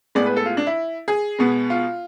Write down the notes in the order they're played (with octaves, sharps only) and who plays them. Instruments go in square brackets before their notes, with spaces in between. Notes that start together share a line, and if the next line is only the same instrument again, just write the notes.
[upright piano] A2 G#3 B3 D5
B4
A4
F4
D4
E4
G#4
B2 G#3 B3
F4